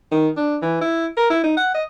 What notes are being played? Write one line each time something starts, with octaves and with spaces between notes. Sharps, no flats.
D#3
D4
E3
E4
A#4
E4
D#4
F#5
D#5